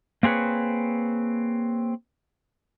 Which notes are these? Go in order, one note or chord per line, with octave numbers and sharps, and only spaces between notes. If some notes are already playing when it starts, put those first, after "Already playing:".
A#3 C4 G#4 B4 C#5